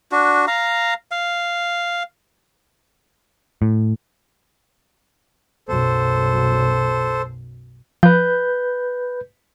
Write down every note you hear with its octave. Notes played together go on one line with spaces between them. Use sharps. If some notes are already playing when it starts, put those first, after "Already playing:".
D4 F#4
F5 A#5
F5
A2
B1 F#2 A4 C5
F3 B4 G6